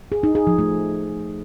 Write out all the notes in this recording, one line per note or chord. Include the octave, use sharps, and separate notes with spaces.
G#4
D#4
G#4
F3
A3